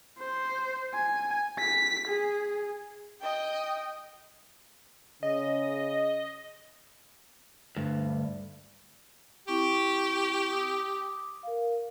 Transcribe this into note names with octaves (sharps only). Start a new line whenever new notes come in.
C5
G#5
B6
G#4
D#5 G5
C#3 D#5
D2 G2
C4 E4 G4 C#6
D6 D#6
A#4 F5